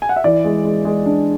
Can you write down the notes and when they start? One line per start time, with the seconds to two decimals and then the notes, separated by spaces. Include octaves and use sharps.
0.02 G#5
0.09 F#5
0.16 E5
0.24 E3 D5
0.44 G#3
0.65 G#3
0.85 G#3
1.06 D4